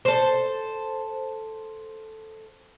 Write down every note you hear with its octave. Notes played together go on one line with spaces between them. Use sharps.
A4 C5